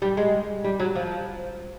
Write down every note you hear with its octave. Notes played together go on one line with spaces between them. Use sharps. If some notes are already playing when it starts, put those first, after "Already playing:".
G3
G#3
G3
F#3
F3